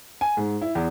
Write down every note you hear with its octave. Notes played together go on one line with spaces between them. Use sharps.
G#5
G#2
E4
E2